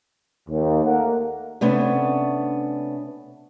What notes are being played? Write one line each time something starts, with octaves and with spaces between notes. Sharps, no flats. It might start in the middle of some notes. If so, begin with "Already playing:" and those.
D#2
A3 A#3 F#5
C3 A3 B3 C#4 D4